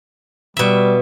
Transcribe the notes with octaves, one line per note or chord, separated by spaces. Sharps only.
B2 G3 E5